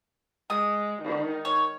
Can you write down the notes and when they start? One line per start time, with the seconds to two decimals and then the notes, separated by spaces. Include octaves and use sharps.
0.50 G#3 D#6
1.02 D#3
1.45 C#5